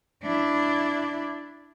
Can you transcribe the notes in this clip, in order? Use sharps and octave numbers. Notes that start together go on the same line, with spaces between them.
D4 E4